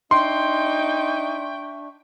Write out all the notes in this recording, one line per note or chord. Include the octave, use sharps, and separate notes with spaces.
D4 D#4 E5 G5 C6 C#6